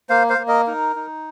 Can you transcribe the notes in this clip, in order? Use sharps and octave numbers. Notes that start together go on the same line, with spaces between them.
A#3 C5 F5
C5 F5
A#3
A#4 D#5
D#4 A#4
D#4